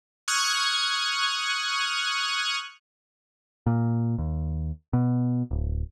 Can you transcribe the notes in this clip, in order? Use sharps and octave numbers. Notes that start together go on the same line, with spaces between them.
C#6 D#6 F6 F#6 G#6
A#2
D#2
B2
D1